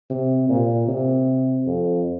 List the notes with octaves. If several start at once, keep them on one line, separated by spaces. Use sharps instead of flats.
C3
A#2
C3
F2